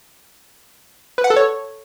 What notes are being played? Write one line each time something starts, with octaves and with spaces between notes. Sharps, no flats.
B4
F#5
A4
C#5